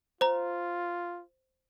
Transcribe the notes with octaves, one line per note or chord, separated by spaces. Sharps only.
F4 C5 A#5